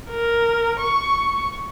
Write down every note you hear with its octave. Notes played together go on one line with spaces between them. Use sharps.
A#4
C#6